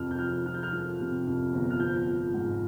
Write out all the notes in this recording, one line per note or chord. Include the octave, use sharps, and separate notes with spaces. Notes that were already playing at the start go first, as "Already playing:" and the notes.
Already playing: F2 C3 F6
G6
F3 F6
F3 F6
G6
F6
F3
C3
F2
G1
F6
F3 G6
F3
G#2